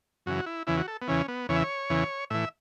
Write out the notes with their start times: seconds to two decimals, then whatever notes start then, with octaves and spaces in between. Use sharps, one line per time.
0.26 F#2 C#3 E3 F#4
0.46 E4
0.67 E2 C#3 E3 E4
0.77 F#4
0.88 A4
1.02 B3
1.08 E2 C#3 E3 C#4
1.28 B3
1.49 E2 C#3 E3 C#5
1.56 E5
1.64 C#5
1.90 E2 C#3 E3
2.30 A2 E3 E5